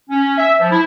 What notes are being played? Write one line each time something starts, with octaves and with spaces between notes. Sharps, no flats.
C#4
E5
F3
E4